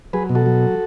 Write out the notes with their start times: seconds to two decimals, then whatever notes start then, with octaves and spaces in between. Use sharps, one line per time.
0.13 F#3 G#4 B4
0.29 B2
0.35 F#4 A4
0.46 F#3